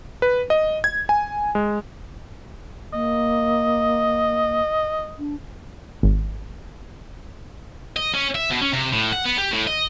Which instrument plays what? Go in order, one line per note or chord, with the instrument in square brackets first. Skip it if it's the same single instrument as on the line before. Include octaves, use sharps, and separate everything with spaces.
[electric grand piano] B4
D#5
G#6
G#5
G#3
[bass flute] A#3 [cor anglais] D#5
[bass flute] D4
[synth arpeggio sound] G#1
[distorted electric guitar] D#5
C#4
E5
B2
C#4
C3
A2
F#5
B3
G4
A2
D#5